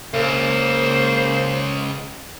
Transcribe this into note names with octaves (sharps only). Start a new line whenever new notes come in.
C#2 A#3 C5